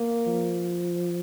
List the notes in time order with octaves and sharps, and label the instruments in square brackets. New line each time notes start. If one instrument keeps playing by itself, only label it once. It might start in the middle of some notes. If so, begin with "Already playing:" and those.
Already playing: [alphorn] A#3
[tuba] F3